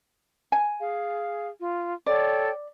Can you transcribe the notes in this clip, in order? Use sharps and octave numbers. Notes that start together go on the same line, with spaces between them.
G#5
G#4 F5
F4
A4 C#5 D5 G5